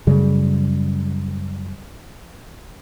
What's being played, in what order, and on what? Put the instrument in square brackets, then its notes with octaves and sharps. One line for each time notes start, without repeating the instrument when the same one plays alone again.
[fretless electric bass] F#2 C#3 G3 A3